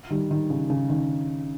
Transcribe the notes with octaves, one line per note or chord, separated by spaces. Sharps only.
D#3 G3
D#3
C#3
C#3
D#3